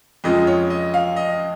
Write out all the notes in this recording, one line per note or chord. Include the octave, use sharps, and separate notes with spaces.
F2 C#3 F3 G#3 D#5
C#5
D#5
F5
D#5